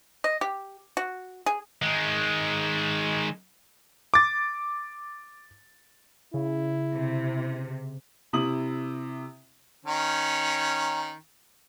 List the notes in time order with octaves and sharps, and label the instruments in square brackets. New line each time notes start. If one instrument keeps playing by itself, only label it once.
[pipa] D#5
G4
F#4
G#4
[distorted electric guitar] D#3 G#3
[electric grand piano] D6 A6
[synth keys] C#3 [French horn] E4
[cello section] C3
[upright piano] C3 E4 D#6 F#7
[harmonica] D#3 C#4